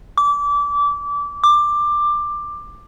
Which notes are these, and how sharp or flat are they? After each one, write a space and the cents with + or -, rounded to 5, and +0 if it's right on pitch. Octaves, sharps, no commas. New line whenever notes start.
D6 -25
D6 +15